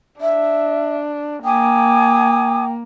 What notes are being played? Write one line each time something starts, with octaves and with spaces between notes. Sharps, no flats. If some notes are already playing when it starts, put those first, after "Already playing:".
D4 E5
A#3 G5 G#5 D6 D#6